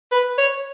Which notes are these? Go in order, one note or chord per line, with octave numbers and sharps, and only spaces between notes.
B4
C#5